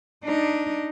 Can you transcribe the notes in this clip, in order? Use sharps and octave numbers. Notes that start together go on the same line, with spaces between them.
D4 D#4